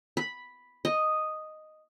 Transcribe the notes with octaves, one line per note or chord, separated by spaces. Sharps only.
B5
D#5